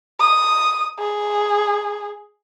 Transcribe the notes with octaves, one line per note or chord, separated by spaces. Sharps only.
D#6
G#4